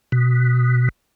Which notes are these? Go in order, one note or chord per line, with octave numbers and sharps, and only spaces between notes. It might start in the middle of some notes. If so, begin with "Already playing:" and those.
B2